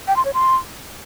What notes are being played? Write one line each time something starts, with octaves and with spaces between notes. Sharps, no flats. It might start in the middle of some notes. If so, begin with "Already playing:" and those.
G5
C6
C#5
C6